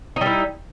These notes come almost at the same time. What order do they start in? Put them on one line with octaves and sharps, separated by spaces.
D#4 G3 E4